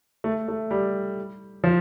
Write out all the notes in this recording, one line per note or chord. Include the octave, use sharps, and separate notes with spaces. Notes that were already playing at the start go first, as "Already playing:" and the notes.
A3
A3
G3
F3